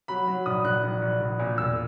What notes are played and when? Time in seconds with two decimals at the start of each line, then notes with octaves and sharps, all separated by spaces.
0.08 F#3 B5
0.28 F#3
0.46 A#1 D#6
0.64 A#1 F#6
0.83 A#1
1.02 A#1
1.20 A#1
1.39 A#2
1.58 E1 E6